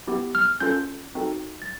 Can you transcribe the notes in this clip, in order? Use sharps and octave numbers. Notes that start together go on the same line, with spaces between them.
B3 E4 G4
F6
C#4 F4 A4 G6
C4 D#4 F#4 A4
A6